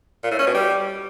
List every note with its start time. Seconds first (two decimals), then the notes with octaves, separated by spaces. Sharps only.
0.23 A#2
0.31 A2
0.39 C#4
0.47 B2
0.54 G3